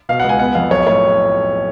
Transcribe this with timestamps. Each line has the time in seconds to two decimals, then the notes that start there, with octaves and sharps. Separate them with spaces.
0.09 B2 F5
0.20 F#5
0.24 C#2
0.29 G#5
0.39 B3 F#5
0.55 F2 F5
0.71 B1 C#5
0.87 A2 C#5